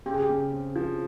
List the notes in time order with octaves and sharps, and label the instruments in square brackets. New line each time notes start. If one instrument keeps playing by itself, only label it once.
[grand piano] C#3 [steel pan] G4
[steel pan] G#4
G4
[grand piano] C#3
C4
F3